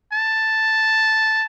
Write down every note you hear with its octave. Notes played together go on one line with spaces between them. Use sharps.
A5